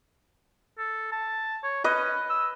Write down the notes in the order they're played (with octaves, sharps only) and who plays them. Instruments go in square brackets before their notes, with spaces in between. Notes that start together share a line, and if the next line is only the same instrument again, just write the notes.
[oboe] A4
A5
C#5
[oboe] C#4 [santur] B4 D#5
[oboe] E6